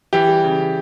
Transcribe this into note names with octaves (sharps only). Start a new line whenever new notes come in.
E3 G4
G3
C#3